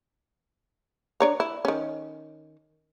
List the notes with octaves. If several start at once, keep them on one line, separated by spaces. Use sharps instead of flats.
D4 C#5 A#5
E4
D#3 C#4